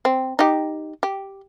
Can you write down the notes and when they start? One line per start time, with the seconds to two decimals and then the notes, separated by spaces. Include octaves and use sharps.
0.05 C4
0.39 D#4 G4
1.03 G4